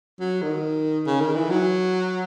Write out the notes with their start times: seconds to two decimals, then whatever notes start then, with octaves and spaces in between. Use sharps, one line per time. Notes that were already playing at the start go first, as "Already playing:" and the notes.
0.20 F#3
0.42 D#3
1.07 C#3
1.21 D#3
1.36 E3
1.50 F#3